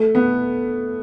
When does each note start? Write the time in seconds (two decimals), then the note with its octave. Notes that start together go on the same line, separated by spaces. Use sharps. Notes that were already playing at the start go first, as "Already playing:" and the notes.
Already playing: A3
0.15 B3